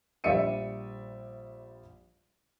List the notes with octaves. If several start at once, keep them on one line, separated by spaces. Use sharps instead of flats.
A#1 G3 D5 E5 C#7 D#7